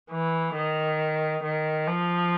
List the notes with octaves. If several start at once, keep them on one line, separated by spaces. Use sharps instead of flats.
E3
D#3
D#3
F3